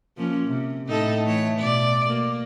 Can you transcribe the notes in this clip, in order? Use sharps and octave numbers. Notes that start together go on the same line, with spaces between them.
F3 A#3 C#4
C3
A2 D#4 A4
E3 A3 C#5
B2 D5
A#3